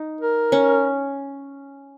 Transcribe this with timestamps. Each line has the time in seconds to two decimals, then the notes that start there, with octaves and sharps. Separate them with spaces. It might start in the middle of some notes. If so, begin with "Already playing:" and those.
Already playing: D#4
0.21 A#4
0.52 C#4